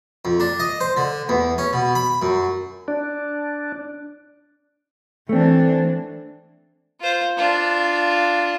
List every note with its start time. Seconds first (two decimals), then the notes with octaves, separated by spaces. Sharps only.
0.25 F2
0.40 D4
0.60 D#5
0.81 C5
0.97 D3
1.29 E2
1.58 C#4
1.73 B2
1.95 B5
2.22 F#2
2.88 D4
5.29 E3 A3 C4 D4
7.00 F4 C5
7.37 D4 F4